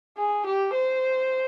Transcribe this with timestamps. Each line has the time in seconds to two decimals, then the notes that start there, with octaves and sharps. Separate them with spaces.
0.18 G#4
0.46 G4
0.74 C5